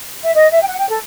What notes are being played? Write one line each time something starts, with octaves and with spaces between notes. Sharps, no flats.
E5
D#5
E5
G5
F#5
G5
A4